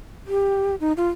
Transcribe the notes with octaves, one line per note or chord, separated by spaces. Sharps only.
G4
D#4
F4